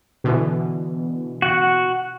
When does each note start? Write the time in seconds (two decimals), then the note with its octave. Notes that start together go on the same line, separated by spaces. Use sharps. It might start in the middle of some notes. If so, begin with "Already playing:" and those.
0.24 B2 D3 E3
1.42 F#4 F#5